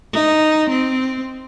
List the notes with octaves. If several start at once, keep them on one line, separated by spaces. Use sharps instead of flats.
D#4
C4